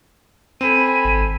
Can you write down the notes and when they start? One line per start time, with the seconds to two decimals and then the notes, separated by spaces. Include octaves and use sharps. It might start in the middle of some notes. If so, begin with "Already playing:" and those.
0.61 C4 A4 G#5 B5 D#7
1.05 G#1